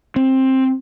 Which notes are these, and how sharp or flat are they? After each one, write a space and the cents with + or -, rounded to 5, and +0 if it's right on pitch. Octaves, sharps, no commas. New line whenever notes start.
C4 +15